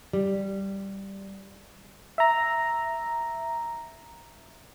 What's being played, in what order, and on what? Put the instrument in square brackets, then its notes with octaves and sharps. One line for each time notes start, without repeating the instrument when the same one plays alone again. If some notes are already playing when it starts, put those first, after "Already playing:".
[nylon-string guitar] G3
[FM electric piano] E5 A#5